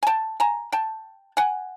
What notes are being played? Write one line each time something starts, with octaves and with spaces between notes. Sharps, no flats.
G#5
G5 A5
G#5 A#5
G5 A5
F#5 G#5